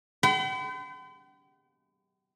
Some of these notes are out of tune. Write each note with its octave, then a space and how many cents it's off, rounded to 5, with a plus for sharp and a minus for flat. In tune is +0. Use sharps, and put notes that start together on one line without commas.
G5 -45 B5 +45